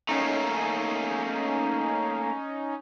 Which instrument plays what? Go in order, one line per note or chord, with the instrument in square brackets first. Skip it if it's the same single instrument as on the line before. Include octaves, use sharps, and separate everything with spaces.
[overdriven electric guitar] A3 A#3 [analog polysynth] C#4 D#4